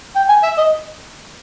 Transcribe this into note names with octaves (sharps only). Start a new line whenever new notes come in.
G5
G#5
E5
D#5